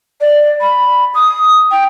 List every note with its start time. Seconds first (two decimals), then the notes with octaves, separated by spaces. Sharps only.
0.21 D5
0.61 B5
1.15 D#6
1.71 G5